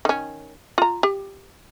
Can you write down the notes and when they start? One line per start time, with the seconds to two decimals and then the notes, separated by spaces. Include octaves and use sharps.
0.05 D#3 C#4
0.78 F4 A#5
1.03 G4